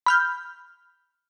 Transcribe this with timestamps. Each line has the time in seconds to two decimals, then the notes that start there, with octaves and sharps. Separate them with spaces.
0.06 B5 F6 G6